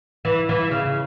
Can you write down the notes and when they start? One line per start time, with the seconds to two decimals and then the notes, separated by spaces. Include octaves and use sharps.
0.25 E3
0.49 E3
0.71 C#3